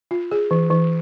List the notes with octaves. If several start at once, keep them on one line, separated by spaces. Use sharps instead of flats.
F4
G#4
E3
E3